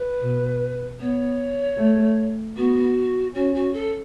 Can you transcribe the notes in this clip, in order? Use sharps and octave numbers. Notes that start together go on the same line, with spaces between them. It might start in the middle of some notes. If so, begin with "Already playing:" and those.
Already playing: B4
B2
B3 C#5
A3
B3 F#4
C#4 F#4
F#4
A4